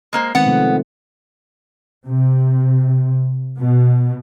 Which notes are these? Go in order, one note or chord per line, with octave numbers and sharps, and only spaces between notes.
G#3 A#3 C5
D#3 G#3 B3 C4 F#5
C3 F3 A3
C3
B2